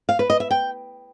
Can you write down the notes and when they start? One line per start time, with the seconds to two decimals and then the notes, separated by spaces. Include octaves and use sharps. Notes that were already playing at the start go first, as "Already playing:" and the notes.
0.09 F5
0.19 B4
0.30 D#5
0.40 E5
0.51 G5